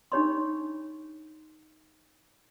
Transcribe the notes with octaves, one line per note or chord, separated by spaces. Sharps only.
D4 D#4 G4 C#5 B5 C6